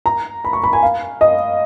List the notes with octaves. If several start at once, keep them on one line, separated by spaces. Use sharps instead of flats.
A#5
B5
C#6
B5
G#5
F5
D#5